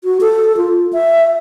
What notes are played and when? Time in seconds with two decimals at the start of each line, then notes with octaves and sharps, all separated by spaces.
0.04 F#4
0.21 A4
0.57 F4
0.93 E5